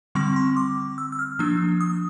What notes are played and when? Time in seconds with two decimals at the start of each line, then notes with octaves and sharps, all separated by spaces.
0.15 D3 G3 C4 C#6
0.36 C6
0.57 D6
0.98 E6
1.12 E6
1.19 F6
1.39 F3 A#3 D4 E6
1.81 D#6